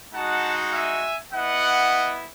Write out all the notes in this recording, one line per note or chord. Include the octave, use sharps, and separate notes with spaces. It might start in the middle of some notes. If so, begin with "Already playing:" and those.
G#3 D#4 F#4 F#5 A5
E5 G#5
B3 E4 D#5 F#5